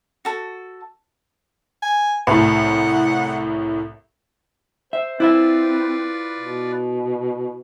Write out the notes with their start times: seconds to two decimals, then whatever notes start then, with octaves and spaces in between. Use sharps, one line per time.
0.25 F#4 A4
1.83 G#5
2.27 C2 A2 F#5
4.93 C5 E5
5.20 C4 E4 F4 B4 C5 D5 E5
6.40 B2